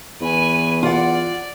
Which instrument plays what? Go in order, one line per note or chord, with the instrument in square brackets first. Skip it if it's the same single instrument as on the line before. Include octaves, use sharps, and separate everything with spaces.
[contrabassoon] E2 [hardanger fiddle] B4 G#5
[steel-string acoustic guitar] F4 F#5 [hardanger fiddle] D5